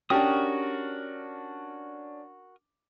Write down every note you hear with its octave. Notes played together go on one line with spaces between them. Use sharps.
C#4 D4 F#4 G4 A#4 D#6